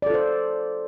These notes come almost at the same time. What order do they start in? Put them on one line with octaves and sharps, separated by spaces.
D5 A4 F4 C5